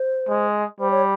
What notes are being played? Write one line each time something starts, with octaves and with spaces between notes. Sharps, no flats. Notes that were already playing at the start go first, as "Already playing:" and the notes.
Already playing: C5
G#3
G3 C5
C#5